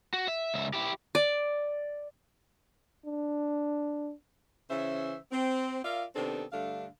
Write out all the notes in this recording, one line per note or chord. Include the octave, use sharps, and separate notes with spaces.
F#4
E5
C#2 E5
E4 G4
D5
D4
C#3 E3 C#4 C5 E5
C4
F4 A#4 D5 E5 F5
C3 D#3 B3 C4 D4 A4
G2 D3 A3 D4 F5